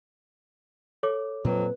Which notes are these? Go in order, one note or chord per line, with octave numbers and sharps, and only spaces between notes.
A4 C#5 D6
F2 A#2 F#3 C4 B4